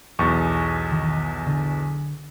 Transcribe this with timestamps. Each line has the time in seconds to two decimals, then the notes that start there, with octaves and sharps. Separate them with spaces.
0.19 B1 E2 C#6
0.91 D#3
1.47 D3